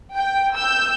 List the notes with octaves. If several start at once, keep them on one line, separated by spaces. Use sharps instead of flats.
G5
E6 G6